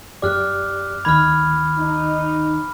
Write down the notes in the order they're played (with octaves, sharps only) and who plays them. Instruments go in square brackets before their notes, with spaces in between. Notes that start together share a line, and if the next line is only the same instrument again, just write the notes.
[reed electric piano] F#2 G4 D5 [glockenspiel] D6 F6 F#6
[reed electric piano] D2 D#3 G#6 [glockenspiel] B5 F6
[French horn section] D#4